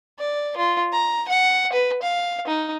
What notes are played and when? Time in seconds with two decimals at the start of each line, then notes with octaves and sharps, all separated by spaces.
0.19 D5
0.57 F4
0.93 A#5
1.28 F#5
1.73 B4
2.03 F5
2.47 D#4